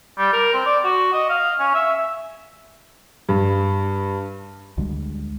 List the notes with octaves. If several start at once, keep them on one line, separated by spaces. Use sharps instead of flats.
G3
A#4
C4
D5
F#4
D#5
F5
C#4
E5
G2
D2 D3 G3 G#3